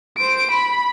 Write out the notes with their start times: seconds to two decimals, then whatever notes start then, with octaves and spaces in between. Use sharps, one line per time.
0.17 C5 D7
0.51 B5